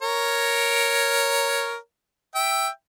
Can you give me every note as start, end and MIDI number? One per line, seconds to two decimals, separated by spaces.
0.02 1.76 70
0.02 1.76 73
2.35 2.68 76
2.35 2.68 79